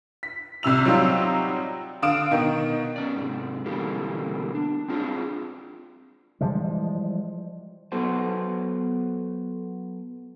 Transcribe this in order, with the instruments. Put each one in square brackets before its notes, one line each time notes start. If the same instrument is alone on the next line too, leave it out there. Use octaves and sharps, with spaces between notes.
[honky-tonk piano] B6
C2 C3 E6 F7
F#3 G3 C4 D#4 F4
D3 F5 D#6 D7 E7
B2 D#3
[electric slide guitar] B3 C#4 D5
G#2 C3
B2 D3 E3 G3 A#3 C4
D4
C4 D4 F4 G#4 C5
[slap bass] E3 F3 G3 G#3
[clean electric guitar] F#3 B3 F#4 A4 C5